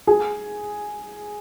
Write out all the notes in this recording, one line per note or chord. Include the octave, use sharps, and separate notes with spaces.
G#4